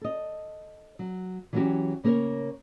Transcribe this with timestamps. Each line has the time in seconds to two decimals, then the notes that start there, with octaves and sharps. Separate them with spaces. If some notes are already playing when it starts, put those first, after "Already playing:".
0.01 A4 D#5
0.99 F#3
1.53 E3 F#3 B3 C#4 F#4 G4
2.04 C#3 A#3 A#4 B4 C#5